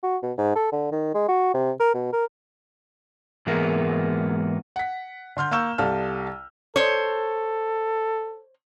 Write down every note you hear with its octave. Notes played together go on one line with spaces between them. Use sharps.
F#4
B2
G#2
A4
D3
D#3
G#3
F#4
C3
A#4
B2
A#4
G#2 E3 G#3 A#3 B3
F#5 B6
D3 C6 F6 G6
A#3 F5 C#6 E6 G6 E7
C2 G3 A4 F5 F6
A4 C5 C#5